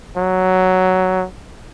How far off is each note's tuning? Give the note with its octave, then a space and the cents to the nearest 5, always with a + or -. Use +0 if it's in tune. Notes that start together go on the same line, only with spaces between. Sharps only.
F#3 +5